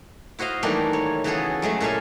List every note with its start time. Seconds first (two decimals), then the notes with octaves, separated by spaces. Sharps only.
0.39 E4 F#4 C5 D#5 F5
0.63 D#3 E3 G3 A3 A#3 D4
0.93 C#5
1.24 C#3 E3 B3 F#4 G#4 A4
1.62 F#3 G#3 A3 E5
1.81 A#2 E4 A4 E5 F5 G#5